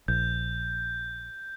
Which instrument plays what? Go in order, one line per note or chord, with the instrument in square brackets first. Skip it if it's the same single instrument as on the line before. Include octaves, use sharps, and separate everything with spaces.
[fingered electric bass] A#1 [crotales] G6